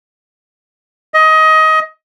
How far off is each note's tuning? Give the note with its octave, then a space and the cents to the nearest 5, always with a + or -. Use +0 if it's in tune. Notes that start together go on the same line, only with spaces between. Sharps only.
D#5 +20